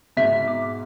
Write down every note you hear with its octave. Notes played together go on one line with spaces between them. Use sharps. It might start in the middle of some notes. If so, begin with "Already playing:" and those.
G#2 B2 E5
D6